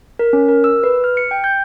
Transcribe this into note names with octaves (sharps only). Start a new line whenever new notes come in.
A#4
C#4
A#4
E6
B4
F6
C#7
G5
G6